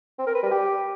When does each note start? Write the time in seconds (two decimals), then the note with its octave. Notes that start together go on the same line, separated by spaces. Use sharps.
0.19 C4
0.27 A#4
0.35 B4
0.43 G3
0.51 G4